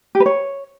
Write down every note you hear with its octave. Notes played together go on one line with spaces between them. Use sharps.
G4
B4
C#5